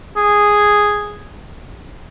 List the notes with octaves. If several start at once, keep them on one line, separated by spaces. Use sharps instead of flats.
G#4